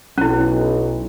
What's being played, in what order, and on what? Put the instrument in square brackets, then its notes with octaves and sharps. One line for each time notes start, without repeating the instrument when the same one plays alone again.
[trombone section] B1 [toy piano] C#4 E4